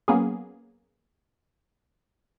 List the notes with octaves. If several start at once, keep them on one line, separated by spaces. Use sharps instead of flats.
F#3 A#3 B3 C#4 G#4